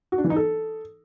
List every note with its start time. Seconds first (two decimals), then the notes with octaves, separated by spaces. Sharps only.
0.12 F#4
0.18 D4
0.24 E3
0.30 D#4
0.36 A4